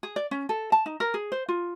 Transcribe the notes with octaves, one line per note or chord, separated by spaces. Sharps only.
G#4
D5
C#4
A4
A5
D#4
A#4
G#4
C5
F4